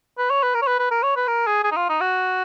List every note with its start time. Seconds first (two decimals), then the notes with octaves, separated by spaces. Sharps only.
0.18 B4
0.30 C#5
0.43 B4
0.55 A#4
0.62 C#5
0.67 B4
0.79 B4
0.91 A#4
1.03 C#5
1.16 B4
1.28 A#4
1.47 G#4
1.64 G#4
1.72 D#4
1.77 F4
1.89 D#4
2.01 F#4